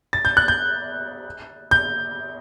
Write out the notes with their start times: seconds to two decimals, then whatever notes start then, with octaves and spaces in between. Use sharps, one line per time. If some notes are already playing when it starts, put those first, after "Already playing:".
0.13 A6
0.25 G6
0.37 F#6
0.48 G6
1.71 G6